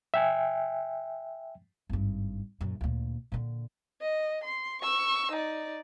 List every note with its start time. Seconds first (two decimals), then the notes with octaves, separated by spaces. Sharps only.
0.14 E5 G5 G#5
1.89 G#1 G2
2.61 F#2 A#2
2.81 D2 A#2
3.32 A#2 D3
4.01 D#5
4.44 C6
4.81 C#6 E6
5.31 D#4 D5